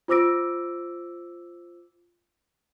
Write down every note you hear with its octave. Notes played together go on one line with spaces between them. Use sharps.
F4 C5 D6 E6 A#6 D7